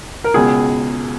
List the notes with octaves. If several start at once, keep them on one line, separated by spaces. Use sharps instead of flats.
A#4
C#2 B2 G#4